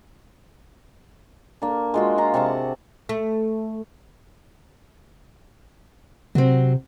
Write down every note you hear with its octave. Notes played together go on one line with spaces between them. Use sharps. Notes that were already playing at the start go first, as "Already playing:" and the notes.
A#3 D4
G#3 F4 F#4
F4 F5 A#5
C3 F#5 A5 C#6
A3
C3 F#3 C4